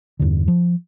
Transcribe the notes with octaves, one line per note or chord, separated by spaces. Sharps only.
E2 G2 D3
F3